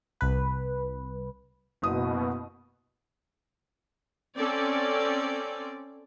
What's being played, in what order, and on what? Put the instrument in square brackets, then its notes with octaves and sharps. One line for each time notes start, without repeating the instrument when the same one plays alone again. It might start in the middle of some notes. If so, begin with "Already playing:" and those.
[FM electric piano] C2 B4
[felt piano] F#1 D#6 [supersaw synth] B2
[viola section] C4 C#4 A4 D5